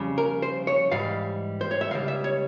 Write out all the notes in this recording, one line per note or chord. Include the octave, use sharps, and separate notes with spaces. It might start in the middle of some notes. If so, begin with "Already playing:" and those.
Already playing: F2 C#3 G3
A#4
C5
C#5
G#2 E3 G3 F5
C5
C#5
E5
C#2 C#3 G3 F5
E5
C#5